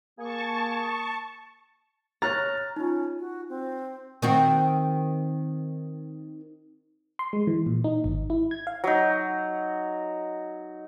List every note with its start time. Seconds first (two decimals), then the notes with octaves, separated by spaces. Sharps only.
0.19 A#3 G#4 A5 C#6
2.22 C#5 A#5 F6 F#6 A6
2.76 C#4 D#4 F4
3.19 F#4
3.49 C4
4.22 D#3 C4 F#4
7.19 C6
7.33 G#3
7.47 E3
7.66 A#2
7.84 D#4
8.04 G#1
8.30 E4
8.51 G#6
8.67 F5
8.84 F#3 D#4